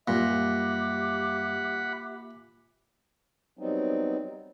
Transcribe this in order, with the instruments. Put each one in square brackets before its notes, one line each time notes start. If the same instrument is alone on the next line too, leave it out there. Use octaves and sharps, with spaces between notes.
[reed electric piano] F#2 G3 [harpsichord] A#2 [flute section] G4 E5 D6 [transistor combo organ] F#5 B5
[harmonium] F#3 G3 B3 C4 D#4